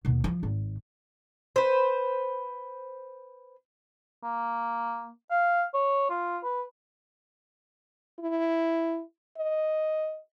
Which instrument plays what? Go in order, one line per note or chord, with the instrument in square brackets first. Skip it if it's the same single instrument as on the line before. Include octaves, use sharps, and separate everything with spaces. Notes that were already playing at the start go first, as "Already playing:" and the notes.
[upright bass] D#2 B2
F3
G#1
[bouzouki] B4 C5
[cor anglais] A#3
F5
C#5
F4
B4
[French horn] E4
D#5